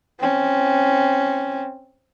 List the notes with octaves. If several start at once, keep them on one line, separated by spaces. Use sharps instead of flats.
C4 C#4